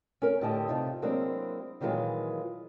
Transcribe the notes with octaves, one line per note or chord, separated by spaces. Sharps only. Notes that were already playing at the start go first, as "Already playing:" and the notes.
C#4 A#4
A2 D3 G4 D#5 G5 A5
C3 D#4 F4
F#3 G#3 A#3 C4 D4 E4
A#2 D#3 E3 F#3 G#3 F4